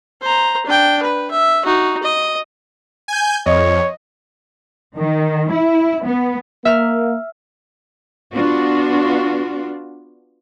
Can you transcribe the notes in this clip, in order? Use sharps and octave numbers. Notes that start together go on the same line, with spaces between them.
C5 A#5
D4 G5
B4
E5
D#4 F#4
D#5
G#5 G6
F2 C#5 D#5
D#3
E4
B3
A#3 E5 F6
B3 D4 F4 F#4